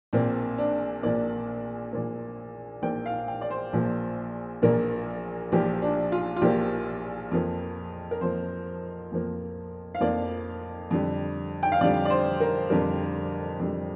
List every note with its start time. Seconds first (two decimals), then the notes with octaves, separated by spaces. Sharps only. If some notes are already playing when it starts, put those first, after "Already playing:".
0.13 A#1 A#2 A#3 C4
0.58 D4
1.03 A#1 A#2 A#3 D5
1.93 A#1 A#2 A#3
2.82 A#1 A#2 A#3 G5
3.06 F5
3.28 G5
3.41 D5
3.50 C5
3.73 A#1 A#2 F3 A#3
4.62 A#1 A#2 F3 A#3 A#4
5.52 A#1 A#2 F3 A#3 G4
5.82 D4
6.12 F4
6.36 F4
6.41 A#1 A#2 F3 A#3 G4
7.31 F2 F3 A#3
8.11 A#4
8.21 F2 F3 A#3 C5
9.12 F2 F3 A#3
9.95 F5
10.00 F2 F3 A#3 D5
10.91 F2 D3 G3
11.63 G5
11.72 F5
11.81 F2 D3 G3 D5
12.05 D5
12.10 C5
12.40 A#4
12.70 F2 D3 G3 A#4
13.60 F2 D3 G3